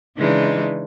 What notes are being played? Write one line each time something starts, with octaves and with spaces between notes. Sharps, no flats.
C#3 E3 G#3 D4 D#4